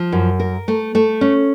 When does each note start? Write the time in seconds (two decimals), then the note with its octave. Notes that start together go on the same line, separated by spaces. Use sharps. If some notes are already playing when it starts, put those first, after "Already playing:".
Already playing: F3
0.12 F#2
0.40 A#4
0.68 A3
0.95 A3
1.21 C#4